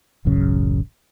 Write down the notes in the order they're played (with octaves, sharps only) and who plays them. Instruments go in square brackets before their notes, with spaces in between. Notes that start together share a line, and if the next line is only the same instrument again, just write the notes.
[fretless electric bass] D1 A1 F#2 C#3